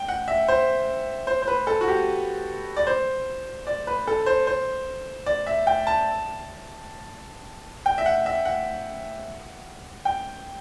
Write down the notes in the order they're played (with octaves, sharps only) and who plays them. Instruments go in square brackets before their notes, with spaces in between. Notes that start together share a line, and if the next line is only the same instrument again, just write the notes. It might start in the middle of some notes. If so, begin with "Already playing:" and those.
Already playing: [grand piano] G5
F#5
E5
C5
C5
C5
B4
A4
F#4
G4
D5
C5
D5
B4
A4
C5
C5
D5
E5
G5
A5
G5
E5
F#5
E5
F#5
G5